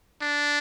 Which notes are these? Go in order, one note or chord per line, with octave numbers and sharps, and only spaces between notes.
D4